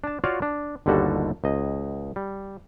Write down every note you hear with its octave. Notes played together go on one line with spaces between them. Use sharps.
D4 A5
F4 F#4 C#5 D5 F5
D4
G1 D#2 D3 G3 F#4 A4
C#2 D#5
G3